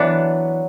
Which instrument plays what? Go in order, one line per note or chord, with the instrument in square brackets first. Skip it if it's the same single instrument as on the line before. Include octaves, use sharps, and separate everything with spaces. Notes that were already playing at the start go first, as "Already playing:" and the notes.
Already playing: [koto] E3 B3 D4 [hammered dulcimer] F#3